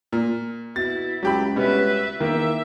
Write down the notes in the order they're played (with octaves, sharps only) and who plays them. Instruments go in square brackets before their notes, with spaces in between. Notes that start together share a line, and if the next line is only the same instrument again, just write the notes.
[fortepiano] A#2
[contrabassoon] B2 [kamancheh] E4 [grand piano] A6
[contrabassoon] C#2 [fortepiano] F#3 G4 B5
[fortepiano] B2 [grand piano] G3 B3 C#4 [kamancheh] B4 E5
[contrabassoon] E2 [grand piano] D#3 A#3 [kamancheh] E5